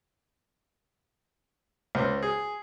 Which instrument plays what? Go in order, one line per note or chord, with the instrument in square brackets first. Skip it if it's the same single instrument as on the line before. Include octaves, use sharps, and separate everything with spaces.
[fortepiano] C#2 C5
G#4